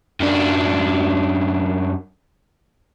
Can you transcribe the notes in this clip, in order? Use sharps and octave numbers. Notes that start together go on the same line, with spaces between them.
F#2 D4